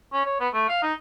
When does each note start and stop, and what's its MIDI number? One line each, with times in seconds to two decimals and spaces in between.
0.13 0.24 61
0.26 0.40 73
0.40 0.49 59
0.54 0.66 57
0.69 0.79 77
0.83 0.94 63